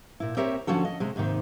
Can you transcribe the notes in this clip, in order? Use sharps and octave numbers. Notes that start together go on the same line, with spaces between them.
A#2 E4
C4 G4 A#4 C#5 E5
D3 F3 C#4 F#4 A4
D#5
C3 G#3
D#2 G#2 C3 D#3